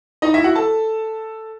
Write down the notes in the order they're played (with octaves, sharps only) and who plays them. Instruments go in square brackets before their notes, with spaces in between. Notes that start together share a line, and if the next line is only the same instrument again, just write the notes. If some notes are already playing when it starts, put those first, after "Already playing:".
[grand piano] D#4 D#5
E4 E5
F#4 F#5
A4 A5